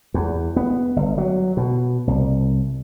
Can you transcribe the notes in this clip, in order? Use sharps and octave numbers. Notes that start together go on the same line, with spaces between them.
E2
B3
G1
F#3
B2
C2